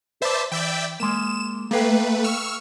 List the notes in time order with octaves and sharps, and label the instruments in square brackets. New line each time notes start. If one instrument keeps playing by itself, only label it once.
[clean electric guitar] B4 D5 [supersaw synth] C5 E5 A5
[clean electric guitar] E3 [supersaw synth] D5 E5 G5
[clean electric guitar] G#3 A#3 [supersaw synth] E7
[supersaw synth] A3 B4 [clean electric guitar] A#3 F5 G5
[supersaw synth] C#6 E6 F6